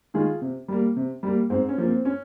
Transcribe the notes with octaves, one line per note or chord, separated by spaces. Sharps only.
D#3 G#3 F4 G#4
C3
G3 A#3
C3
G3 A#3
G#2 C4
C#4
F3 A#3
C4
C#4